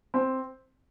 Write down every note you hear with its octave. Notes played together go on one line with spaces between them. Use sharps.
C4